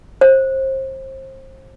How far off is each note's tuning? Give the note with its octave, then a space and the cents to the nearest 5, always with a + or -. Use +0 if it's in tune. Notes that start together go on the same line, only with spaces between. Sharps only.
C5 +30